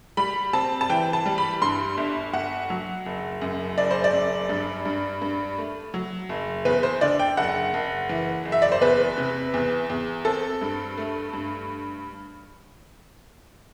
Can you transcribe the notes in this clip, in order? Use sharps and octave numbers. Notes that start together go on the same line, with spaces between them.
G3 B5
C4 A5
A5
E3 G5
A5
G3
B5
G2 C6
G1
G1 F#5
F#3
F#1
F#2
F#1 D5
C5
D5
F#2
G2
G2
G2
A3
F#3
F#1
E2 B4
C5
D3 D5
G5
F#1 F#5
F#1
E3
F#1
E5
D5
C5
E2 B4
C3
E2
E2
C4 A4
G2
A3
G2